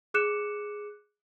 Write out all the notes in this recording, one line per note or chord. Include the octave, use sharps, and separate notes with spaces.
G#4 D6 F#6 C#7 E7